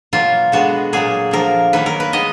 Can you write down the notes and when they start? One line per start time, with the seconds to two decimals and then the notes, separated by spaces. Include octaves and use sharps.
0.13 B2 F#3 A#3 F4
0.52 D3 G#3 B3 F#4
0.93 A#2 F#3 A#3 G#4
1.31 D3 F3 A#3 A#4
1.73 D#3 F#3 A#3 B4
1.86 A#4
2.00 B4
2.13 D#3 G#3 B3 D#5